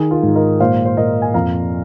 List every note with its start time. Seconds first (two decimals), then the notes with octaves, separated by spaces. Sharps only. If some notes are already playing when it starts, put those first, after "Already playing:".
Already playing: D#3 G#4
0.11 F4 A#4
0.23 G#2
0.35 A#4 D#5
0.60 A#2 C5 F5
0.85 C5
0.97 A#2 A#4 D#5
1.22 G#5
1.34 F2 F5 A#5